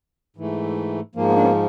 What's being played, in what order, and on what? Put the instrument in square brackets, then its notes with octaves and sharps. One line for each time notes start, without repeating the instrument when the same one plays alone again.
[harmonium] G#2 E3 A3
G#2 F3 A#3
B3
D4
B3 C#4